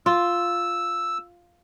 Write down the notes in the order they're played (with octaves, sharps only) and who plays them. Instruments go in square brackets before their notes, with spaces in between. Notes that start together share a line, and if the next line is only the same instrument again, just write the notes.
[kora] F4 [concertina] E6